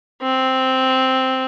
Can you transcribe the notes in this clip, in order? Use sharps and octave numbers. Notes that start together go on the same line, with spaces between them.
C4